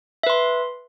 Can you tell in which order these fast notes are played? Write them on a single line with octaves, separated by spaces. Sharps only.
E5 B4 C6